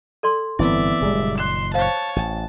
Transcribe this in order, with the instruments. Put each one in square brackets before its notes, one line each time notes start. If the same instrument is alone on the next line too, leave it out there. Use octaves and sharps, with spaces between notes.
[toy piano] A4 D5 C6
[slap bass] G1 A2 [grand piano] E3 B3 C4 [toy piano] E4 [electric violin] D5 E5
[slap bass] F#1 A#2 D#3 [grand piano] G3 G#3 G#4
[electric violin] C6 [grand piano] F#6 E7
[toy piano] C5 F5 [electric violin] C#5 A5
[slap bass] A1 [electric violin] A5